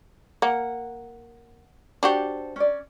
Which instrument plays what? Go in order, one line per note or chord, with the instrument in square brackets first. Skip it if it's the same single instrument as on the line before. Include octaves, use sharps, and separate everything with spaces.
[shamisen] A#3 [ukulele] F#5
[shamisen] D4 F#4 G4 [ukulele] A4 C5
[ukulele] C#4 D5